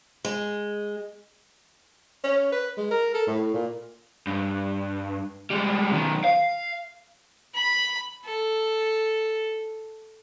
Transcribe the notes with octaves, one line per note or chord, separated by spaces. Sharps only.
G#3
C#4
B4
G#3
A#4
A4
A2
A#2
G2
G3 G#3
B1 D#3
F5
B5
A4